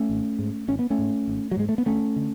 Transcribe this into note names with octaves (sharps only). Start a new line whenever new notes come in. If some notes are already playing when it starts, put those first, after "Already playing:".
Already playing: A3 C#4
G#1
G#2
G#1 C#4
B3
A3 C#4
G#2
G#1
F#3
G#2 G#3
A3
B3
D2 A3 C#4
D3